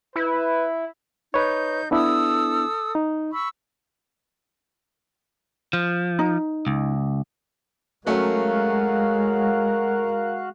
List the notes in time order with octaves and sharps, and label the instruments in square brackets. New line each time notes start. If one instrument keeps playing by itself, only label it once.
[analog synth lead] E4 [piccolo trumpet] B4
[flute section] D#4 G6 [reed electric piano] B4 C#5
[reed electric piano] B3 D4 E4 [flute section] A4 D#6 E6
[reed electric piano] D#4
[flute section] B5 C#6 E6
[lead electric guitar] F3
[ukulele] D#4
[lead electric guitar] C#2
[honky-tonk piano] F#3 A3 C#4 [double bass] G#3 [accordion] F#4 F5 F#6 [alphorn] A#4